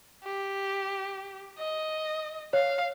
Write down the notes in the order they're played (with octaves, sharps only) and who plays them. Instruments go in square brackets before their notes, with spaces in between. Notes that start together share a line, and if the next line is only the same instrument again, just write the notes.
[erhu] G4
D#5
[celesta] C#5 [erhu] F5